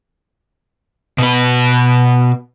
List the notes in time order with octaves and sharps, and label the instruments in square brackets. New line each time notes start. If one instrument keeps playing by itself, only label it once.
[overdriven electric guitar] B2 B4